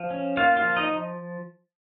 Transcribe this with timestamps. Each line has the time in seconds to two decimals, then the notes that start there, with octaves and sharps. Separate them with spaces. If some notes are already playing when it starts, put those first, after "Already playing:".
Already playing: F3
0.10 C#4
0.37 A#3 F4 F5
0.57 F4 F5
0.63 F3
0.76 D#4 D#5
0.89 F3